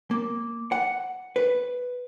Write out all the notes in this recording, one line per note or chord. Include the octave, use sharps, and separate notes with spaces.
A#3
F#5
B4